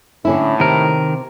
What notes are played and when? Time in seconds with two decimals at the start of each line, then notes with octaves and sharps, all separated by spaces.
0.25 A2 D3 C#4 E4
0.60 C3 D#3 A#4